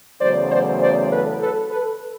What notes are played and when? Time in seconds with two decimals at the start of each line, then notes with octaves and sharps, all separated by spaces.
0.20 E2 C#3 F#3 A3 C5 D5
0.50 C5 D5
0.80 C5 D5
1.11 A4 B4
1.40 A4 B4
1.70 A4 B4